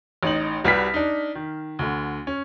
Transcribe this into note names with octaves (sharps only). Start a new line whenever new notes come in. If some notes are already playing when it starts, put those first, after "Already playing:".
A1 D#4 F#7
C2 G3 F#4 B4 F6 B6
D4 D#4
D#3
D2 D3
C#4